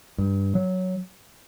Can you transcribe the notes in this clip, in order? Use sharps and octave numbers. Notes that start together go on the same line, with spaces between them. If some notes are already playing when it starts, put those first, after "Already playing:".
G2
F#3